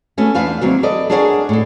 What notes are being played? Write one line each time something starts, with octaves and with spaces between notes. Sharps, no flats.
A3 B3 C#4 F#4
E2 D4 B4 F5
D#2 F#3 C4 F#4
A4 B4 D5 D#5
D4 G#4 A#4 C#5 D5 F#5
A2 A4